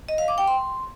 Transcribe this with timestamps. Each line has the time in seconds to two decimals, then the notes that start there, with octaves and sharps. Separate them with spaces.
0.09 D#5
0.18 F5
0.28 D6
0.38 G5
0.48 C6